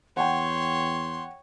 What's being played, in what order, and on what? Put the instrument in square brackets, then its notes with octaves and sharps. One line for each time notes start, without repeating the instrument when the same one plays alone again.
[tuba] E2 [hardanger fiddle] C#5 [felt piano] F#5 G5 [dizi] C6